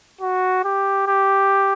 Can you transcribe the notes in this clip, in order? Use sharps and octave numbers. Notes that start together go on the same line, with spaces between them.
F#4
G4
G4